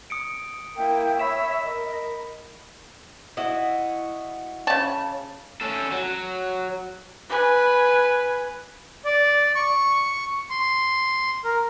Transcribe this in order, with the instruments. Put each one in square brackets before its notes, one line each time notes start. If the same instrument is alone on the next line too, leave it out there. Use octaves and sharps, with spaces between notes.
[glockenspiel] D#6 C#7 D7
[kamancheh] A#3 E4 [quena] G5
[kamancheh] C#5 E6 [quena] E5 [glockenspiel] B5 B6 E7
[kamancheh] A#4 [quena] D#5
[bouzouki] E4 F#4 D#5
[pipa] C#3 A5
[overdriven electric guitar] C#4 A4
F#3
[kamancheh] B4 G#5
[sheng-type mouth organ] D5
C#6
C6
A#4